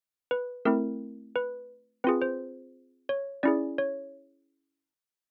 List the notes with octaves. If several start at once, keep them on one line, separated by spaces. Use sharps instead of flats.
B4
A3 C4 E4 A#4
B4
C4 F4 G#4 B4
C5
C#5
C#4 E4 G#4 D5
C#5